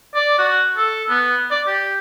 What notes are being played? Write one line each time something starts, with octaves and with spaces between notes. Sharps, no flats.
D5
F#4
A4
B3
D5
G4